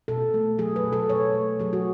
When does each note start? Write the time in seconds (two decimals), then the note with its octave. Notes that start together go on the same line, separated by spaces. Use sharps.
0.08 B2 A4
0.34 A3
0.58 F#3 G#4
0.76 B4
0.84 B2
0.93 A4
1.09 B2 C#5
1.34 A3
1.60 F#3 G#4
1.73 F#4